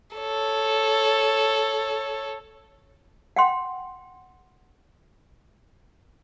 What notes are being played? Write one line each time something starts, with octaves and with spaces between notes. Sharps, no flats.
A4 C#5
F#5 G5 C6